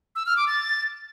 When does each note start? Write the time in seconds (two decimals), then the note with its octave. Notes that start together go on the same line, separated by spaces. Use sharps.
0.16 E6
0.26 F6
0.37 D6
0.47 A6